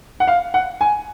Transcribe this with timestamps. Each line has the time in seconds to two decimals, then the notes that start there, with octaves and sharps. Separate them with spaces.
0.20 F#5
0.27 F5
0.54 F#5
0.81 G#5